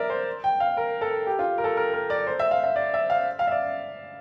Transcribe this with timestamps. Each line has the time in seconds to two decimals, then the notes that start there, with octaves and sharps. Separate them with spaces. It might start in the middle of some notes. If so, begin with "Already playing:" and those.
Already playing: A#4 D5 E5
0.10 C5
0.44 G5
0.60 F5
0.77 A#4
1.01 A4
1.27 G4
1.39 F4
1.58 A#4
1.64 A4
1.77 A#4
1.94 A#4
2.10 D5
2.27 C5
2.39 E5
2.51 F5
2.64 E5
2.76 D5
2.94 E5
3.10 F5
3.39 F5
3.47 E5
3.51 D5